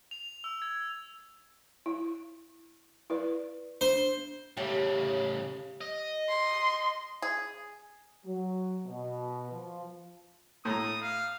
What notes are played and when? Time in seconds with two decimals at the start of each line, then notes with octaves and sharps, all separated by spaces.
0.11 F7
0.44 E6
0.62 G#6
1.86 E4
3.10 E4 B4 D5
3.81 D4 C5
4.57 A2 C#3 G4
5.81 D#5
6.28 C6
7.22 G#4
8.24 F#3
8.86 B2
9.51 F3
10.65 A2 A#5 D#6
11.02 F5